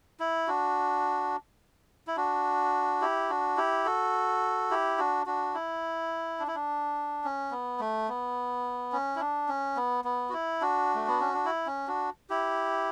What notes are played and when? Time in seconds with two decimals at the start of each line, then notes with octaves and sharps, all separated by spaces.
0.20 E4
0.48 D4 F#4
2.07 E4
2.17 D4 F#4
3.01 E4 G4
3.30 D4 F#4
3.57 E4 G4
3.86 F#4 A4
4.71 E4 G4
4.98 D4 F#4
5.26 D4 F#4
5.54 E4
6.40 D4
6.47 E4
6.55 D4
7.24 C#4
7.51 B3
7.80 A3
8.09 B3
8.92 C#4
9.16 E4
9.20 D4
9.49 C#4
9.77 B3
10.05 B3
10.29 F#4
10.33 E4
10.61 D4 F#4
10.95 A3
11.08 B3
11.21 C#4
11.33 D4
11.45 E4
11.67 C#4
11.88 D4 F#4
12.30 E4 G4